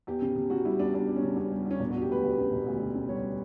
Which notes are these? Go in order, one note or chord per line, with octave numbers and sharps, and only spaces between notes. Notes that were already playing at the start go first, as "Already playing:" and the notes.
E2 G4
C#3
C#3
C#3 F#4
G3 E4
E2 D4
E2 D4
G3
C#4
C#3
E2 C#4
G3
E2 C#4
E1 D4
E1 F#4
G4
D2 B4
D2
C#3
E1
D2
D2
C#3
G3 C#5